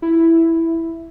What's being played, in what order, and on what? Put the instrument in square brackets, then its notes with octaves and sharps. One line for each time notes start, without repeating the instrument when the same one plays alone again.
[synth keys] E4